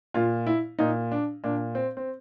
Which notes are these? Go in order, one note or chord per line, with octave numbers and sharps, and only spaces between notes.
A#2 F4
E4
A#2 D#4
D4
A#2 D4
C4
C4